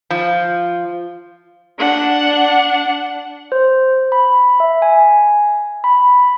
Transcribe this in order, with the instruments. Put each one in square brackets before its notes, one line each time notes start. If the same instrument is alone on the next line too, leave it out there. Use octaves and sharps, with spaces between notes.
[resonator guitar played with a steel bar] F3
[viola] D4 F#5
[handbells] C5
B5
E5
G#5
B5